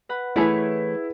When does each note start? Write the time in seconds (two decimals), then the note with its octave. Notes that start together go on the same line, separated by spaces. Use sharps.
0.09 B4 F#5 B5
0.36 E3 A3 E4 G#4 B4 C#5